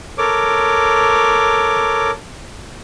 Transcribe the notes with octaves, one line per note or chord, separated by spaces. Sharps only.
A4 A#4 C#5 D6